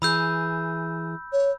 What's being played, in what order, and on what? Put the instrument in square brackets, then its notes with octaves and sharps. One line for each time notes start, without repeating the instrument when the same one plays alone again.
[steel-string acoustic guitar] E3 G#4 [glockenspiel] B5 E6 G6
[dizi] C#5